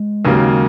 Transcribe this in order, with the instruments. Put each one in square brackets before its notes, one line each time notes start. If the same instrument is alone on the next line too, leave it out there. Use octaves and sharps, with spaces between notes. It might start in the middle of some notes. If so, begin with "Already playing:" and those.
Already playing: [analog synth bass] G#3
[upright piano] D#2 C#3 F#3 A#3